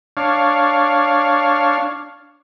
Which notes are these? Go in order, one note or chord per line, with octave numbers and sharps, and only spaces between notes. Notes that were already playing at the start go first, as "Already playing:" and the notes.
D4 C#5 F5